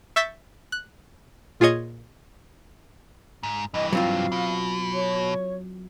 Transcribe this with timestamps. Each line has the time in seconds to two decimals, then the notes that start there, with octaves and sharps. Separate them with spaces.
0.16 E5 C#6 E6 G6 A6 B6
0.72 F#6
1.60 A#2 F4 G#4 C#5 D#5 G#6
3.43 G#2
3.74 G2 E3 D#5
3.93 F#3 C4 F4 F5
4.32 B2
4.93 C#5